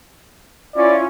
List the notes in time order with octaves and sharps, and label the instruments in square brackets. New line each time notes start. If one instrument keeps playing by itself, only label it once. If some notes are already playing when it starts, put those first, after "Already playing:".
[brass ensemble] C#4 E4 F4 [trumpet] D5